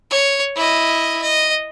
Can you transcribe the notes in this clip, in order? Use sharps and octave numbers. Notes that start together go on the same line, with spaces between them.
C#5
E4 D#5
D#5